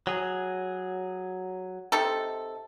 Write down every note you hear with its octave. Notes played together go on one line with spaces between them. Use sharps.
F#3 G#4
C3 D#4 A4